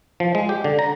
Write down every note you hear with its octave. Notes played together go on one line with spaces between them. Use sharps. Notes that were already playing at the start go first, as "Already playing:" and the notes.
F3
G#3
G4
D3
A#5